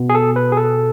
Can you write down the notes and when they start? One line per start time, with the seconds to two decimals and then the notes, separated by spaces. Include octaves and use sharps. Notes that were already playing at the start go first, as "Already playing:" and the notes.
Already playing: B2 B3
0.09 G#4
0.15 A4
0.36 B4
0.52 G#4
0.57 A4